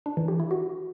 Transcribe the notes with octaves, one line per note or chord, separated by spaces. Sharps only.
D4
E3
G4
E4
F#4